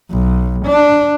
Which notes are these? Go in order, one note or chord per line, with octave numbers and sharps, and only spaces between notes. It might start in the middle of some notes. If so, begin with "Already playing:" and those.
B1
D4